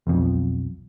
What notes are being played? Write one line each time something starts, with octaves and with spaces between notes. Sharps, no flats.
E1 B1 F2